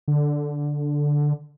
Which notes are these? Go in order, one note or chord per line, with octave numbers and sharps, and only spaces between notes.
D3